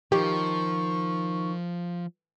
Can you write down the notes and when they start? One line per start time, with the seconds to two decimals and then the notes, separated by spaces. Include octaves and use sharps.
0.12 D#3 F3 G4 C#6